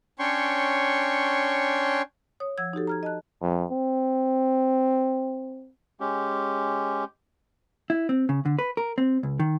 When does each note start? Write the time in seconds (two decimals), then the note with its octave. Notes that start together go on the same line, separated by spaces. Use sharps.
0.19 C#4 D4 C#5 G5 C6 C#6
2.40 C#5 D#6
2.58 F3 F#5 E6 G#6
2.73 D#4 F#4 G4 A4
2.87 A#5 F6 G#6
3.03 D#5 A5 F#6
3.42 F2
3.71 C4
6.00 G#3 C#4 G4
7.90 E4
8.09 C4
8.29 C#3
8.45 D3
8.59 B4
8.77 A#4
8.98 C4
9.23 C#2
9.40 D#3